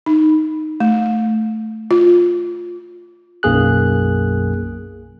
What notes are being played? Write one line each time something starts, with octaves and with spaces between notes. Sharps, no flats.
D#4
A3
F4
B1 F#2 A#3 G#4 F#6